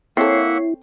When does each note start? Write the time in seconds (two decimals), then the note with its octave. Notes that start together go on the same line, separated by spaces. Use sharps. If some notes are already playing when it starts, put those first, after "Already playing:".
0.17 A#3 C4 E4 A4 C#5 E5 F#5 C7